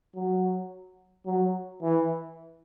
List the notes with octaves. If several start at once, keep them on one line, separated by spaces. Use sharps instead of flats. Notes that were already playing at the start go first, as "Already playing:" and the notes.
F#3
F#3
E3